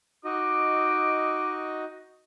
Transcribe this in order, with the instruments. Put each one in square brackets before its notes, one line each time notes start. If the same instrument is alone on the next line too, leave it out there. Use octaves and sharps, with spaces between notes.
[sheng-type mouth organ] D#4 F#4 D#5 [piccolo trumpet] D6